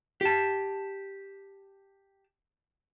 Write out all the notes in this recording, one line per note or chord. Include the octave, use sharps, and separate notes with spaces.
G4 A5